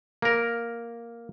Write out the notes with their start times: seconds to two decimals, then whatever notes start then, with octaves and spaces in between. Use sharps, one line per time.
0.22 A#3 A#4